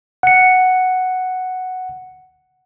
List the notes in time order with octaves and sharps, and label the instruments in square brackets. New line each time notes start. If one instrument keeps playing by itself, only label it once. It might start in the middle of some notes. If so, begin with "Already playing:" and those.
[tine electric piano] F#5 C#7